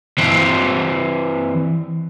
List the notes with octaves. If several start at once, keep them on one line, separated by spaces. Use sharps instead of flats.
E3 C4